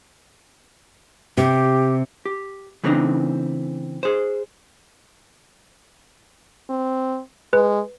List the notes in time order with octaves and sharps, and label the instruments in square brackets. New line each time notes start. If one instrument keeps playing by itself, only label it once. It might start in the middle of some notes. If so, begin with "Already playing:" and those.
[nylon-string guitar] C3 [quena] G4
[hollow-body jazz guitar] G4
C#3 E3 A3 C4 D4 D#4
G#4 C5
[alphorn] C4
[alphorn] G#3 [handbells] B4